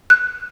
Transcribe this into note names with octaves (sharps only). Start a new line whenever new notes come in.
F#6